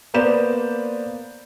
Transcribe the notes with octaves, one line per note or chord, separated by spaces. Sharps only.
A#3 B3 C5 D5 G6 E7